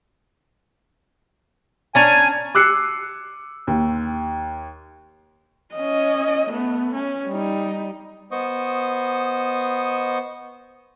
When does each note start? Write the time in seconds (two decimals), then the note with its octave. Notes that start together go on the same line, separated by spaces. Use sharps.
1.95 C#4 D4 G#5 A#5
2.55 D6 E6 F#6 C7 C#7
3.67 D#2
5.75 C#4 D#5
6.50 A3 B3
6.95 C#4
7.27 G3 D#4
8.31 B3 C5 D#5 C#6 D#6